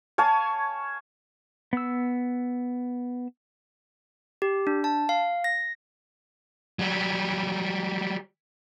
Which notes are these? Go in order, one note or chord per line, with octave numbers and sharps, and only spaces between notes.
C#5 F5 G#5 A5
B3 E6
G4
D4
A5
F5
A#6
F#3 G3